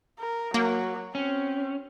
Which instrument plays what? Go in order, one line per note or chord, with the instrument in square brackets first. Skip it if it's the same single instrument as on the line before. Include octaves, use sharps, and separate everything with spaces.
[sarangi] A#4
[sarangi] F#3 [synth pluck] A#3
[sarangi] C4 [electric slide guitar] C#4